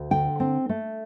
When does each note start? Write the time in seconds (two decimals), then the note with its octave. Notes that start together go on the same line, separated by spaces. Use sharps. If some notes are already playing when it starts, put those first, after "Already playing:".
Already playing: D2
0.11 D3 G5
0.40 C4
0.69 A3